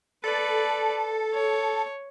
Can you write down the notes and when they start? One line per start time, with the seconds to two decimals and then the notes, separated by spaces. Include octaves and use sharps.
0.24 A4 B4 D5
1.33 C#5